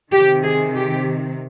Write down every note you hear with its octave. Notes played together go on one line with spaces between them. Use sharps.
C3 D#3 G4
G#4
G4